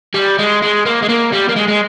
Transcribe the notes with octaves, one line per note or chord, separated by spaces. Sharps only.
G3
G#3
G#3
A#3
G#3
A#3
G3
A#3
G#3
G#3